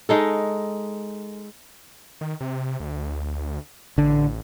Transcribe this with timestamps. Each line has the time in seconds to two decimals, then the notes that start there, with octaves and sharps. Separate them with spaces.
0.09 G#3 D#4 A4
2.21 D#3
2.41 C3
2.80 D2
3.98 A1 D3